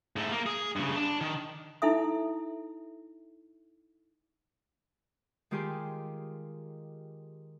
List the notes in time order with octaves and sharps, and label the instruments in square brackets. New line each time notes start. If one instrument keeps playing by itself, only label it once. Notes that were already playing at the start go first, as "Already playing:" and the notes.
[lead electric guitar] G#2 A3
A#3
G#4
G2 C#3
D4 A5
D#3
[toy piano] D#4 E4 A4 E5 D#6
[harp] D#3 G#3 F4 G4 G#4 C6